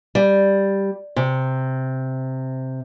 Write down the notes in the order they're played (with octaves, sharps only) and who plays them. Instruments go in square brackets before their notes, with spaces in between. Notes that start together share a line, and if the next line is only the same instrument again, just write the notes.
[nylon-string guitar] G3
C3